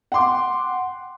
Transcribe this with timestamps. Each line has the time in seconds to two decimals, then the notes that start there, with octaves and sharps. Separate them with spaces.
0.12 F#5 G5 C6 D6